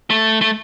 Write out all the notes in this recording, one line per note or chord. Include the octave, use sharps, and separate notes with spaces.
A3
A3